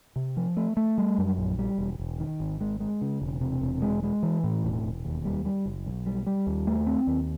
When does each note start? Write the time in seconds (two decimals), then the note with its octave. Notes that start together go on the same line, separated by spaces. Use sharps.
0.16 C3
0.37 F3
0.57 A3
0.77 A3
0.98 G3
1.18 F#2
1.38 A#1
1.59 G3
1.78 E1
2.00 E1
2.19 D#3
2.40 G#1
2.61 G#3
2.80 G#3
3.01 C#3
3.21 E1
3.41 C3
3.61 E1
3.82 G#3
4.03 G#3
4.23 E3
4.44 A2
4.64 E1
4.83 E1
5.05 D#2
5.25 G3
5.45 G3
5.66 F#1
5.86 B1
6.06 G3
6.27 G3
6.47 D#2
6.67 A3
6.87 C4
7.07 D#2